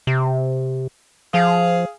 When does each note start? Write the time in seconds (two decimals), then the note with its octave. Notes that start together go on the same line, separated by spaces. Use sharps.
0.07 C3
1.34 F3 G#4 F5